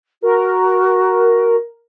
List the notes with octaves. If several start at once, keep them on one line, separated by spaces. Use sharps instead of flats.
F#4 A#4